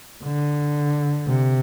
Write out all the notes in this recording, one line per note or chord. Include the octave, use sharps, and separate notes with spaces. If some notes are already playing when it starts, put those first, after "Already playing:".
D3
C3